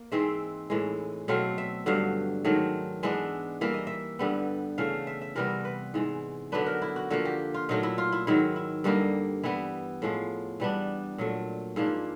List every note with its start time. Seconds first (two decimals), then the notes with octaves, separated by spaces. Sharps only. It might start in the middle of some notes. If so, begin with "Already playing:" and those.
Already playing: A#3
0.12 G#2 E3 G#3 C4 E5
0.70 A2 E3 G#3
1.28 B2 F#3 A3 C4 F5
1.58 E5
1.86 G2 D3 F#3 F5
2.45 G#2 D#3 F#3 A3
3.03 E3 G#3 B3 D4 E5
3.61 E3 G3 A#3 E5
3.74 D#5
3.87 E5
4.19 G2 D3 G3 B3
4.78 C#3 E3 A3 F5
5.07 E5
5.22 E5
5.36 C3 E3 G3 B3 A#4
5.65 B4
5.94 G#2 E3 G#3
6.52 D3 F#3 B3 D4 B4
6.66 A#4
6.82 E4
6.96 F#4
7.10 D3 F3 A#3 F#4
7.25 G4
7.54 F4
7.69 A#2 F#3 A3 D#4
7.83 E4
7.98 F4
8.12 E4
8.27 G#2 D#3 F#3 E4
8.56 E4
8.84 G2 D3 G3 A#3 D#4
9.43 E3 G3 B3 E4
10.02 A2 F3 G#3
10.60 E3 G3 B3 D4
11.18 A#2 F#3 A3
11.76 G#2 F3 A#3 D4 E4